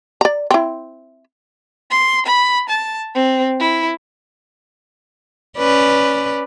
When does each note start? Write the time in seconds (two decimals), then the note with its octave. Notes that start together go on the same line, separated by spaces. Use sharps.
0.21 D5 A#5
0.51 C4 E4
1.90 C6
2.26 B5
2.69 A5
3.14 C4
3.60 E4
5.58 C#4 B4 D5